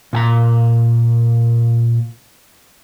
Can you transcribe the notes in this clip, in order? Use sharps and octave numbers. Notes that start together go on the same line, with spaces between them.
A#2 G#5 A#5